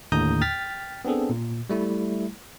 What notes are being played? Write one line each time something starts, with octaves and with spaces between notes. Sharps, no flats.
D#2 A2 D3 A#5 D#6 G6
G5 F6 A6 B6
B3 C4 D4 G#4 A4
A#2
G3 A3 E4